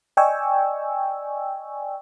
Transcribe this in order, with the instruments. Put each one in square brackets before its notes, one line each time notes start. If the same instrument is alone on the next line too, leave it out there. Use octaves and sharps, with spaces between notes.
[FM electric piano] D5 D#5 G5 G#5 C#6 E6